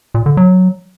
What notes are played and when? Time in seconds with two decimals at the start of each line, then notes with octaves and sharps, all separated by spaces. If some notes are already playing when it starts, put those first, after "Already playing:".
0.14 A#2
0.26 D3
0.37 F#3